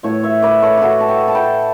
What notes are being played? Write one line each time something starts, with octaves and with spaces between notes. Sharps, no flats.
A2 E3 A3 C#5 E5
C#5 E5
B4 D5
A4 C#5
F#4 A4 B4
A5
E5 G5
A5
G5 B5